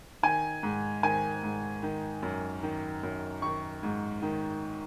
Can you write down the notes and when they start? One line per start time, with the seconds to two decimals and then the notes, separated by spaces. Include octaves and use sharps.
0.23 D#3 G#5
0.63 G#2
1.03 D#3 G#5
1.43 G#2
1.83 D#3
2.23 F#2
2.63 D#3
3.03 F#2
3.42 D#3 C#6
3.83 G#2
4.22 D#3